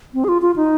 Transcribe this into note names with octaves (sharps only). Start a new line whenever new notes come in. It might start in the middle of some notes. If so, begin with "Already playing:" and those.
C4
G#4
F4
F4
D#4